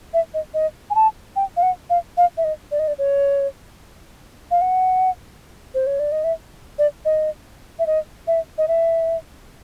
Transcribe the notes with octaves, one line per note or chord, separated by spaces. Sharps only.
E5
D#5
D#5
G#5
A5
G5
F5
F#5
F5
F5
E5
D#5
D5
D#5
D5
C#5
F5
F#5
C5
C#5
D5
D#5
E5
D5
D#5
E5
D#5
E5
D#5
E5